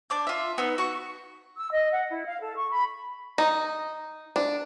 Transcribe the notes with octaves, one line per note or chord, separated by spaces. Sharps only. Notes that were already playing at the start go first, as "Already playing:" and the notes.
D4 D6 G6
F4 E5
B3 D#4 E6
F#4 C#6
E6
D#5
F#5
E4
F5
A4
C#6
B5
D#4
D4